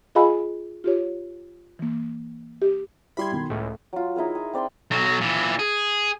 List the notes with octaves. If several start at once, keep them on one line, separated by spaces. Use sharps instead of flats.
F4 G#4 D#5 F5 G#5 B5
F4 G4 C#5
E3 A#3
G4
G3 E4 B5 C6 G#6
B1 D#3
C#2 A2 A3
F#3 F4
D#4 E4 G#4 A#4
G#4
C4 D5 G5 C6
B1 F#3
A#2 E3
G#4